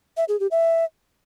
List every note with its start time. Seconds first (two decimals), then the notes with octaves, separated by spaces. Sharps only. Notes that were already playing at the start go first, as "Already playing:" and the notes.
0.17 E5
0.29 G#4
0.40 G4
0.51 E5